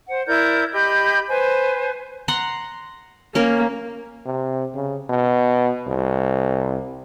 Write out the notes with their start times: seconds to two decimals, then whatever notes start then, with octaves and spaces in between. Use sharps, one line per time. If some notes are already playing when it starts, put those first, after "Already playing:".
0.09 C5 F#5
0.27 E4 A#4 D5 G6
0.73 G4 D#5 B5 G6
1.29 B4 C5 G#5
2.28 F#5 A#5 C6
3.35 A#3 C#4 A#4
4.26 C3
4.75 C#3
5.10 B2
5.87 C2